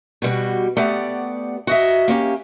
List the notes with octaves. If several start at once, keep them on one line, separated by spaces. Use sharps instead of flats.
B2 G3 F#4
A3 B3 G4 D5 F#5
F#4 D#5 E5
A#3 C#4 G4